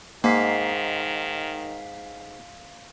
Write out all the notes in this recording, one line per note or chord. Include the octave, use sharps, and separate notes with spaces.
G#2 D#3 A#3 F5 B6 C7